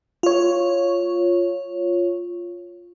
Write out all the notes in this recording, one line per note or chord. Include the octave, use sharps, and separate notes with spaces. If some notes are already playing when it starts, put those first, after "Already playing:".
F4 C#5